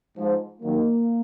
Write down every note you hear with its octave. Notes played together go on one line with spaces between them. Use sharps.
G#2 F3
D#2 D#3 F#3 A#3